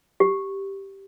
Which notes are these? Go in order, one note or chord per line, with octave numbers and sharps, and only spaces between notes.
G4